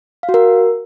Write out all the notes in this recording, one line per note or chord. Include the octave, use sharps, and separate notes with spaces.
F5
F#4
A#4